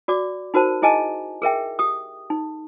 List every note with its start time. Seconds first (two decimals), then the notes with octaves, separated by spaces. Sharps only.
0.08 F#4 D5 D6
0.54 D#4 F#4 A#4 C5 A5
0.82 E4 G#4 D#5 G#5 A5
1.42 G#4 A#4 E5 G5
1.79 G4 D#6
2.30 D#4